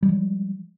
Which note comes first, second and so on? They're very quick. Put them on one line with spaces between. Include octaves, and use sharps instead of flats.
G3 G#3 F3